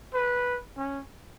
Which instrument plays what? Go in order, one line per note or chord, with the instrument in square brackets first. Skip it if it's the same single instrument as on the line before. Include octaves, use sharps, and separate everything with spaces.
[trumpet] B4
C#4